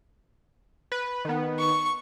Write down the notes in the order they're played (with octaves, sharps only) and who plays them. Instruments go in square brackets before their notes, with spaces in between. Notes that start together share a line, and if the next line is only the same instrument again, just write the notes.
[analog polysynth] B4
D#3 B3
[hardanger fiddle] C#6